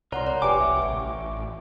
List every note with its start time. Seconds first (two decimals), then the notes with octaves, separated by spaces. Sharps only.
0.12 C2 A#4 C#5 D5 F#5 A#5 C6
0.27 D5 C6
0.42 F1 G4 B4 G5 G#5 D6 D7
0.60 C2 E5
0.82 A1 C#6